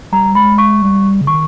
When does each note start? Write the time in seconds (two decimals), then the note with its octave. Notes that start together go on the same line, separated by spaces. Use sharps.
0.12 G3 A#5
0.35 G#3 B5
0.58 C#6
0.82 G3
1.21 C#3
1.27 D#3 C#6